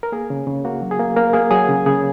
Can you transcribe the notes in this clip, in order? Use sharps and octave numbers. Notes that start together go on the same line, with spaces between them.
A#4
A#3 G#4
C#3
C#3
A#3 F#4
F#3
G#4
A#3
A#3 A#4
A#3 G#4
F#3 G#4
C#3
C#3 G#4